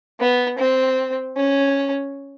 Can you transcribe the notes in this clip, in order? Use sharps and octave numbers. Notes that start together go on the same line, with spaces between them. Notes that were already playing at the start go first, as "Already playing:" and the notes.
B3
C4
C#4